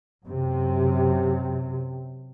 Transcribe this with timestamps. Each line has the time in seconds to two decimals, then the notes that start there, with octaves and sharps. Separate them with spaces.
0.24 F#2 C3